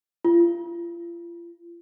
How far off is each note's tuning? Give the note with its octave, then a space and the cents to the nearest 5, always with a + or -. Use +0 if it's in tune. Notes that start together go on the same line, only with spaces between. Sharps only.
F4 -35